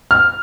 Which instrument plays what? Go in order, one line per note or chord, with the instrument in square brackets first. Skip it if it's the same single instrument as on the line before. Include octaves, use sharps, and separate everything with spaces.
[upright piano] F6